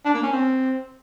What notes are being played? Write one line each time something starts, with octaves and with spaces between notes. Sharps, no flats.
D4
A#3
C#4
C4